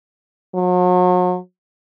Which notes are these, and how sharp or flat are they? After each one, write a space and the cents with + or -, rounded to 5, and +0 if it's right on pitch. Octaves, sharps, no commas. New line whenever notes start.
F#3 -40